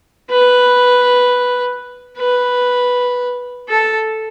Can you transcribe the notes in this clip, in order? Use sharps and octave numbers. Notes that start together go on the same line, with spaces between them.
B4
B4
A4